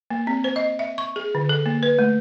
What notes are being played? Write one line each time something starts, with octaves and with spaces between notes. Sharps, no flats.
A#3
C4
C5
D#5
E5
C#6
G#4
D3
A4
A#3
B4
A3